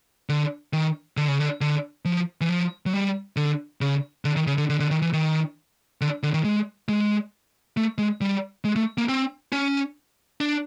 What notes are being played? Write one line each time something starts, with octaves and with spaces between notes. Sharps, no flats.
D3
D#3
D3
C#3
D3
D3
F3
E3
F3
F#3
G3
D3
C#3
D3
D#3
C#3
D3
D3
D3
D#3
E3
D#3
D3
D3
D#3
G#3
G#3
A3
G#3
G3
G#3
A3
A#3
C4
C#4
D4